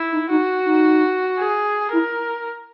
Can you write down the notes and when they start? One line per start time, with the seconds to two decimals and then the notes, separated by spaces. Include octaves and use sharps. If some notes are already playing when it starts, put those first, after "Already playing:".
Already playing: E4
0.12 D#4
0.30 D#4 F#4
0.66 D#4
1.38 G#4
1.92 E4 A#4